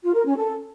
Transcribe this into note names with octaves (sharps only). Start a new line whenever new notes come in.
F4
A#4
C#4
A4